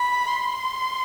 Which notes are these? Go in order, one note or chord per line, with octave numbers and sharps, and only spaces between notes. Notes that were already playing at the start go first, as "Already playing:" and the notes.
Already playing: B5
C6